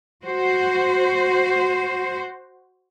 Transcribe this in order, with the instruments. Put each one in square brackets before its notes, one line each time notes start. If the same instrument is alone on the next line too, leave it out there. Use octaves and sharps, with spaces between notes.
[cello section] F#4 C5